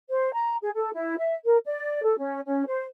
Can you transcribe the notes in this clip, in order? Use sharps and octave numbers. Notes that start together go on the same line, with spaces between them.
C5
A#5
G#4
A4
E4
E5
A#4
D5
A4
C#4
C#4
C5